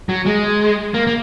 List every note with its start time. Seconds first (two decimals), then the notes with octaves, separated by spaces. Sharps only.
0.09 F#3
0.26 G#3
0.94 A#3
1.07 A#3